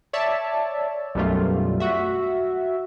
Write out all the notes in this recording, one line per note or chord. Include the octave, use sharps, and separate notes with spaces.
C#5 D5 E5 A5
B1 F#2 B2 G3 A3 F4
F#4 E5